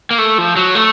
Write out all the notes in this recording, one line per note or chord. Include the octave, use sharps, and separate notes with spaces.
A#3
A3
F3
F#3
A3